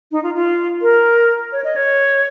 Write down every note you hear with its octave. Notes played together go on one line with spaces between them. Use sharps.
D#4
F4
F4
A#4
C#5
D#5
C#5